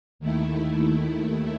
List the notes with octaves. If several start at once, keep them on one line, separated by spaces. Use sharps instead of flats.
D#2 D#3 A3 E4